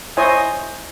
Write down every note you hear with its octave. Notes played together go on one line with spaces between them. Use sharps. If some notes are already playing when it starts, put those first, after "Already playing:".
E4 C5 C#5 D#5 G#5